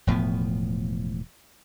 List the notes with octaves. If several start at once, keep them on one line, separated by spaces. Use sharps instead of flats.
E1 A2 F3 B3